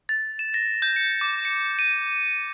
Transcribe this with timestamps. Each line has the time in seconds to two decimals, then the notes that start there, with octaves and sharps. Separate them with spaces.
0.09 A6
0.39 E7
0.54 A#6
0.82 G6
0.96 C#7
1.21 D6
1.45 C#7
1.79 D#7